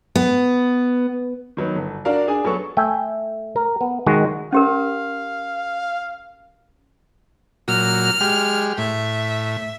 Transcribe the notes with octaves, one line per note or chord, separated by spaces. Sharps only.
B3
D#3 F#3 B3
G1
D4 F#4 A#4 D5 F5
D4 G#4 G#5
F#3 B3 A4 C#6
A3 E5 G5 G#5
A#4
B3
D#3 G#3 F#4
C#4 G4 A#4 F5
A#2 F#3 F6
G#3 G4
A2 E5